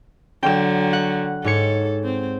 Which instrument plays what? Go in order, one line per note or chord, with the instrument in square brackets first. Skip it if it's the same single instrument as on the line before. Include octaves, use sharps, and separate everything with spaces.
[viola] D3 F#3 [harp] G5 E7
[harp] F#5
[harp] G#2 C#5 C#7 [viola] A4
[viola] C4